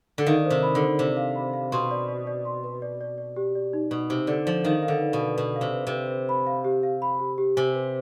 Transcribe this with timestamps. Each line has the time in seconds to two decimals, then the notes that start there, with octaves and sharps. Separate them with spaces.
0.18 D3
0.26 D#3 F5
0.45 C5
0.50 C3
0.63 B5
0.75 D3
0.81 C5
0.99 C3 C5
1.17 F5
1.36 B5
1.53 F5
1.72 B2 C6
1.91 D5
2.08 D5
2.27 D5
2.45 C6
2.64 B4
2.82 D5
3.01 D5
3.18 D5
3.36 G4
3.55 D5
3.73 D#4
3.91 B2 D#4
4.10 C3 D#4
4.27 D3 D5
4.45 F3 D5
4.64 D#3 F5
4.83 F5
4.88 D3
5.01 B4
5.13 B2
5.20 B4
5.37 B2 B4
5.56 F5
5.61 C3
5.74 B4
5.87 C3 B4
6.10 B4
6.29 B5
6.47 F5
6.65 G4
6.83 F5
7.02 B5
7.19 G4
7.38 G4
7.57 C3 G#5
7.74 B4